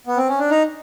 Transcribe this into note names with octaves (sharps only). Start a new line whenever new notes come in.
B3
C4
C#4
D4
D#4